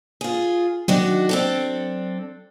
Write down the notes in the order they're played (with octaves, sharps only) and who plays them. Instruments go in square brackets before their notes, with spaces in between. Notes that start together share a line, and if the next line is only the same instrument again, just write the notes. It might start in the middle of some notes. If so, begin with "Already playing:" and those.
[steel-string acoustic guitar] F4 G#4
[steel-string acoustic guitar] D#3 D4 F#4 [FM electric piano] F#3
[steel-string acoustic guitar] C4 D4 A4